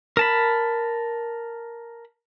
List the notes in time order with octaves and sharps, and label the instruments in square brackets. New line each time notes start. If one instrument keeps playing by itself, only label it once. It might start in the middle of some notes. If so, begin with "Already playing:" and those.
[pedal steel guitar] A#4 A5 B5